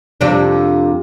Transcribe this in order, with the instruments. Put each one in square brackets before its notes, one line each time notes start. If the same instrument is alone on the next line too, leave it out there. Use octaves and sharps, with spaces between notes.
[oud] F2 C3 D4